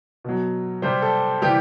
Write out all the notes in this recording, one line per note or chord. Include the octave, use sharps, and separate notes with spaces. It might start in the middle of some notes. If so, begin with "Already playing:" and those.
B2 F#3
C3 G3 C5
A4
C3 E3 G3 G4